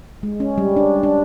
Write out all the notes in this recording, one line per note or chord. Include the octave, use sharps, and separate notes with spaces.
G#3
C#4
G3
D4
D4